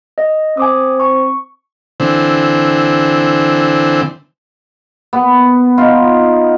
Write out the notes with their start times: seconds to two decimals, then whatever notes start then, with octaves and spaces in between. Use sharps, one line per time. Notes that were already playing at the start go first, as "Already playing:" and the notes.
0.18 D#5
0.57 C4 G#5 D6 D#6
1.00 C#6
2.00 D3 E3 C4
5.13 B3
5.78 D#4 F4